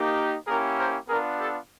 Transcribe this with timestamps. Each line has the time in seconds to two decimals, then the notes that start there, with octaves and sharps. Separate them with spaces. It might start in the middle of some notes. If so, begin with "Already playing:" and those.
Already playing: A#3 D#4 G4
0.47 A#3 C#4 E4 G4 G#4 A#4
0.78 A#4 C5
1.08 B3 D4 F4 G#4 A#4
1.39 G4 A4